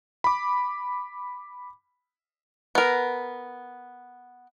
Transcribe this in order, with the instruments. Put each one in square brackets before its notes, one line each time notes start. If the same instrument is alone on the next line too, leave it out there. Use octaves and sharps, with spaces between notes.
[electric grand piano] B5 D6
[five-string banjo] B3 A#4